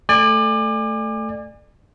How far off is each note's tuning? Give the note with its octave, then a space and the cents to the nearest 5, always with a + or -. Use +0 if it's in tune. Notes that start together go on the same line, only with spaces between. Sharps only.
A3 +0 D5 +25 G#5 -30